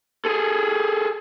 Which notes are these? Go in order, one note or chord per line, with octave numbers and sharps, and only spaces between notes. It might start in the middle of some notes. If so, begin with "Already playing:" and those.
G#4 A4